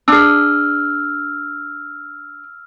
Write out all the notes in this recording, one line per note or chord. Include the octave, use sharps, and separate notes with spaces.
D4 G#4 E6 F6